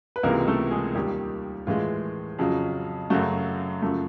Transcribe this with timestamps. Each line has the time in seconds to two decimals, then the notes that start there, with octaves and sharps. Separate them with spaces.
0.16 B4
0.23 C#2 C3 E3 G#3 A#3 A#4
0.48 A3 A4
0.71 G#3 G#4
0.95 D#2 D#3 G3 G4
1.67 A2 E3 G#3 F4
2.39 F2 C#3 F#3
3.10 F#2 C#3 F#3 A3 F#4
3.82 F#2 C#3 F3 A3